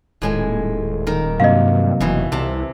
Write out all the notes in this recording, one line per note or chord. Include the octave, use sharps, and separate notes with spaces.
D#1 A2 G#3 G#5
D#3 A#4
G2 C3 F#3 A#3 D#5 F5
F1 B2 E3
C2 C3 C4 A5